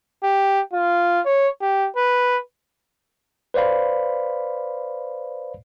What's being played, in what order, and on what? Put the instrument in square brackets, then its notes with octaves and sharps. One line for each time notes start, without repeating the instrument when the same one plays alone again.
[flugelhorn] G4
F4
C#5
G4
B4
[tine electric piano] B4 C5 D5 F5 B5